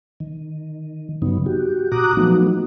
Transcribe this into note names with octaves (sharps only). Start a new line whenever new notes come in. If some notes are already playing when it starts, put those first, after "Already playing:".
D#3
G2 C#3 F#3 B3 D#4
F#4 G4
A#2 F#4 A#5 D6 D#6 F#6
F3 F#3 A3 B3 D#4 F#4